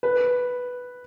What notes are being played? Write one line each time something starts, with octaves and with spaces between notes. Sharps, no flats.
B4